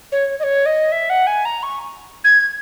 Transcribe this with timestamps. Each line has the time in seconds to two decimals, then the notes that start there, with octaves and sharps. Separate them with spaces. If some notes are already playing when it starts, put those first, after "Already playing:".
0.12 C#5
0.39 D#5
0.43 C#5
0.65 D#5
0.92 E5
1.09 F#5
1.26 G#5
1.45 A#5
1.63 C#6
2.24 G#6